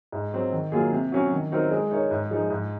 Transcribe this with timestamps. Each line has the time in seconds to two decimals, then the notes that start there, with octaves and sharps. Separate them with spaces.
0.12 G#2
0.33 F#3 C4
0.52 D#3
0.72 F#3 A#3 F4 G#4
0.92 C3
1.12 F#3 C#4 F#4
1.32 D#3
1.52 F#3 C4 D#4 A#4
1.71 G#3
1.91 D#4 A#4 C#5
2.11 G#2
2.30 F3 G#3 D#4
2.50 G#2